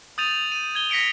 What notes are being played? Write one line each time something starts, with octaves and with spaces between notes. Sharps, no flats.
D#6 G6 A6 D#7 F7
D#7
G#6 G7
A#6 B6 C#7 D7 F7